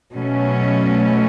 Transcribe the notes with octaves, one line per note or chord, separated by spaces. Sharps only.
B2 F#3 A3 C#4